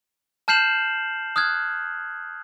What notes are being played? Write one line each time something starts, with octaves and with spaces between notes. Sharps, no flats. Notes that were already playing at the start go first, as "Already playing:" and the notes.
A5 F6 G6 C7 E7 F#7
D#6 F6 F#6 G#6